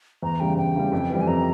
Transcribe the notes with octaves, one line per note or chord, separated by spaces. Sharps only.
E2 A#5
C#3 E3 G3 G5
E2 G5
C#3 E3 G3
F2
E3 G3 C4
G#5
F2 A#5